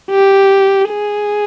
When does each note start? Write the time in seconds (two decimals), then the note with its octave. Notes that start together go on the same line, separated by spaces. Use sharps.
0.11 G4
0.89 G#4